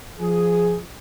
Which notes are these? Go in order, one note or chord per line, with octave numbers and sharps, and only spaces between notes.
F3 G#4